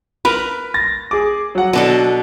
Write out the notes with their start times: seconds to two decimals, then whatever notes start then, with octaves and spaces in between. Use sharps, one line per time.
0.25 A#4 B4 B5
0.74 A6 A#6
1.11 G#4 D6
1.55 F#3 F#5
1.73 B2 D4 A4